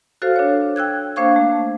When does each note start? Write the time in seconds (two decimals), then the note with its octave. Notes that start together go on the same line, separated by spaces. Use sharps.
0.22 F#4 A4 C5 F5 F6
0.36 D4 C#5
0.76 G5 E6 F#6 G#6
1.16 A#3 D4 C5 F5 C#6 G#6
1.36 A3